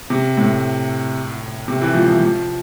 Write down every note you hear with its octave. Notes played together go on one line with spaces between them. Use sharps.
C3
A2
C3
E3
F3
F3
F3